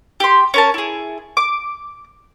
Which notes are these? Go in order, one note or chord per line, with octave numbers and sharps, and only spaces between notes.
G4 C6
C#4 A#4 A5
E4 G#4
D6